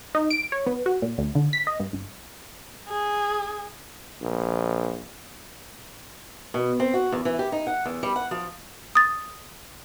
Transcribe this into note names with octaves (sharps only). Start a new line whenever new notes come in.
D#4
D7
C#5
B3
F#4
A#2
D2
D3
B6
D#5
G2
G1
G#4
A#1
B2
C4
F#4
E2
E3
G4
D#4
F#5
E2
G3
F#5
F3
D#6 A6